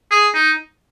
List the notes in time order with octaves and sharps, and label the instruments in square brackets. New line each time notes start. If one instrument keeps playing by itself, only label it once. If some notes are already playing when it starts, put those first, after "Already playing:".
[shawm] G#4
D#4